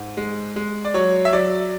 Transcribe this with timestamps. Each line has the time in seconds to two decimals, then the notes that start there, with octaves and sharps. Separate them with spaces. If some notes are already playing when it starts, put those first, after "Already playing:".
Already playing: G#2
0.17 G#3
0.56 G#3
0.85 D5
0.94 F#3 C#5
1.25 E5
1.33 F#3 D5